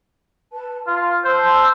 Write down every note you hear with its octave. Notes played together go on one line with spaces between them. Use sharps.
B4 A5
F4 F6
C5 A5 E6 G6